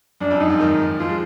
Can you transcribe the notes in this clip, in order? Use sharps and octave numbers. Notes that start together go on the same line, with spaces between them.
F#2 D4
F2
F#2 D#4
G#2
D#3
F3 F4
G#3